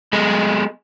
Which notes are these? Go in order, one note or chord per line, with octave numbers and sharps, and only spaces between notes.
G#3 B3 G#4 A4 D#5 G#5